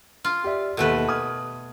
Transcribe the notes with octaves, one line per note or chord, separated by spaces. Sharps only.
F4
G4 D5 E5
D#2 B2 A3 A4 B4
D#6 F6 G#6